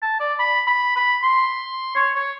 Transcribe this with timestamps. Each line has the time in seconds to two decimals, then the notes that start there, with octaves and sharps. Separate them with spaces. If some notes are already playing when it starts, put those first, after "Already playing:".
0.02 A5
0.20 D5
0.39 B5
0.67 B5
0.96 B5
1.23 C6
1.95 C#5
2.15 C#5